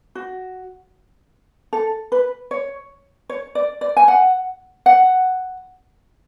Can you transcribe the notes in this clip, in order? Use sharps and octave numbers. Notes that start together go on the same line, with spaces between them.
F#4
A4
B4
C#5
C#5
D5
D5
G#5
F#5
F#5